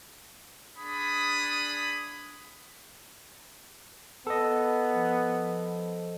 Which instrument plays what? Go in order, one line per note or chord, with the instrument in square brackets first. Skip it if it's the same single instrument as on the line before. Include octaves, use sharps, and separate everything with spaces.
[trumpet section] D4 G#4 B5 D#6
[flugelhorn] B3 [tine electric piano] A4 D#5
[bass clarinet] F3